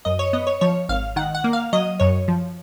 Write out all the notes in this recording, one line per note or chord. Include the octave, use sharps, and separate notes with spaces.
F#2 D#5
C#5
B3 D#5
C#5
F3 C#5
G#1 F5
D#3 F#5
F#5
A#3
F5
F#3 D#5
F#2 C#5
F3